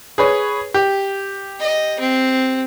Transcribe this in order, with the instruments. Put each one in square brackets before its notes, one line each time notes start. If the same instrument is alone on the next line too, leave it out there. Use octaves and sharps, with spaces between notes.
[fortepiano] G#4 B4 C#5
G4
[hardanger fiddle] D#5
C4